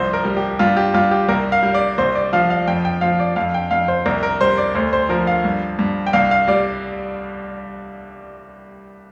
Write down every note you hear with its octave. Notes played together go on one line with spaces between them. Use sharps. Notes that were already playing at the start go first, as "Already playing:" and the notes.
Already playing: C2 F3 C5
A#4
G3
G4
G2 F4
G4
G2 F4
G4
C2 A#4
F5
G3
D5
C2 C5
D5
F3 F5
F5
F2 G5
G5
F3 F5
D5
F2 F5
G5
F2 F5
C5
C2 A#4
A#4
G3 C5
D5
D2 C5
C5
F3 A#4
F5
G2
G2
G5
C2 F5
F5
G3 D5